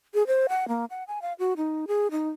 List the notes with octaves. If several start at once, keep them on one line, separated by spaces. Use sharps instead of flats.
G#4
C5
F#5
A#3
F#5
G#5
F5
F#4
D#4
G#4
D#4